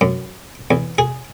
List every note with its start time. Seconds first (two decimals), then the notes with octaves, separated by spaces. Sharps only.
0.01 F#2
0.71 E2
0.98 G#4